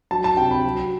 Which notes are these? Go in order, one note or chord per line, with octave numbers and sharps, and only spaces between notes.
F#3 A5
A5
C3 G5
B5
F#3